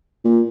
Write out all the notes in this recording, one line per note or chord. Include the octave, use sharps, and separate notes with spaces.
A#2